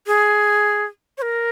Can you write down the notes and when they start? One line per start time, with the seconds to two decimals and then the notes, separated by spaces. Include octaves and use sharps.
0.07 G#4
1.18 C#5
1.22 A#4